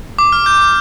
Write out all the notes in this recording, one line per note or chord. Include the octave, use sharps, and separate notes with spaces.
D6
F6
G6